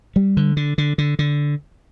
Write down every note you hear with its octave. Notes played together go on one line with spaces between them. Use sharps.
G3
D3
D3
D3
D3
D3